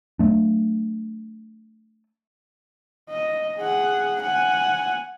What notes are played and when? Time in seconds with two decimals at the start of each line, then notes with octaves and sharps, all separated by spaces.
0.19 F#3 A3 D4
3.09 D#5
3.58 G#4 F#5
4.21 F#5 G#5